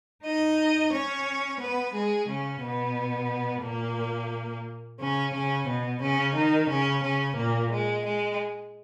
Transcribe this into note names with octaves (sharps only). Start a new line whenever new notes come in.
D#4 D#5
C#4 C#5
B3 B4
G#3 G#4
C#3 C#4
B2 B3
A#2 A#3
C#3 C#4
C#3 C#4
B2 B3
C#3 C#4
D#3 D#4
C#3 C#4
C#3 C#4
A#2 A#3
G#3
G#3